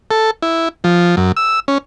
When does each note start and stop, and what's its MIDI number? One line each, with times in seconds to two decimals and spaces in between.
0.11 0.31 69
0.42 0.69 64
0.84 1.15 53
1.17 1.32 42
1.37 1.60 88
1.68 1.78 61